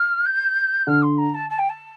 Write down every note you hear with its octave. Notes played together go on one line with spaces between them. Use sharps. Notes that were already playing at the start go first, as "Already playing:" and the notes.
Already playing: F6
G6
D3 F6
C6
A#5
A5
A5
G5
A5